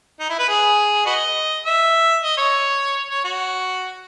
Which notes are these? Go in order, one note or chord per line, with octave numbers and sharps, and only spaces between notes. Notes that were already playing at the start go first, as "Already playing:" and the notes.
D#4
E4
B4
G#4
F#4 B4 D#5
E5
D#5
C#5
C#5
F#4